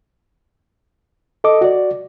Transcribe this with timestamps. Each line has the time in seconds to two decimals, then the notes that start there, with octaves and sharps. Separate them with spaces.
1.44 A4 D#5 D6
1.61 F#4 D5